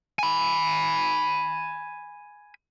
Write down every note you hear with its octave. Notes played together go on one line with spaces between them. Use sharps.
G#5 B5